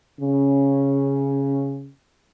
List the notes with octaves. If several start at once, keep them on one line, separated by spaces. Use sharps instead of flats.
C#3 C#4